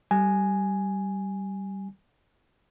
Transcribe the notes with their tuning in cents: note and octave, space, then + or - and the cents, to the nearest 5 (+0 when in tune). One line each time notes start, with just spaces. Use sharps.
G3 -15 G#5 +0